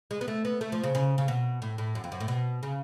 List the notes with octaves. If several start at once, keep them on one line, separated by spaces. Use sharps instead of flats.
G#3
B3
A3
B3
A3
F3
C#3
C#3
C#3
B2
A2
A2
F#2
F2
F#2
A2
B2
C#3